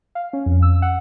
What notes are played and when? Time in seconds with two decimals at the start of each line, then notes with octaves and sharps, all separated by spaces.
0.15 F5
0.33 C#4
0.46 F2
0.62 E6
0.82 F#5